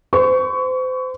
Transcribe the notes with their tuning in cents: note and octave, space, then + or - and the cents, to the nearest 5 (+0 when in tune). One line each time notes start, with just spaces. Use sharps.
C5 -35 C#6 +20